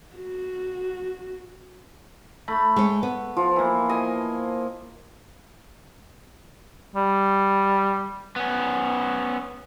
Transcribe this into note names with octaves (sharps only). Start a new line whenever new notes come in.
F#4
A3 B5
G#3 C#5
B3
F3
E3 A#3
D#5 G#5
G3
B3 C#4